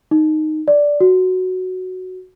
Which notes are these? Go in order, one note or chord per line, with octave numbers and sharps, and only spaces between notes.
D#4
D5
F#4